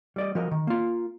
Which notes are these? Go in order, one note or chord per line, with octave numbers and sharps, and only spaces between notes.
G3 D5 D#5
F3 F#4 A#4 D#5
D#3
A#3 F4